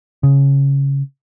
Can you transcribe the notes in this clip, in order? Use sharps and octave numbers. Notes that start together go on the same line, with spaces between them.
C#3